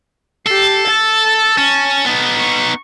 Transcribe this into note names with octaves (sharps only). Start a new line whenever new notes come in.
G4 A4 C7
A5
C#4
B3 D#4
C#6